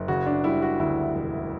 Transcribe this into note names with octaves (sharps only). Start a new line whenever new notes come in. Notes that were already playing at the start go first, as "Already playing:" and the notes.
Already playing: F#1
C#3 F#4
D4
G3 E4
F#4
D2 E4
E1